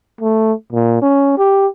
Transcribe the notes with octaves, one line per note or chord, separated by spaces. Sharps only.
A3
A#2
C#4
G4